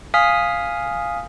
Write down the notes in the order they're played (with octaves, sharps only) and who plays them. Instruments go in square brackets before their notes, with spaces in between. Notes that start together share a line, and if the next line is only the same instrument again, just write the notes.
[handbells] F5 G#5 D#6 F6 B6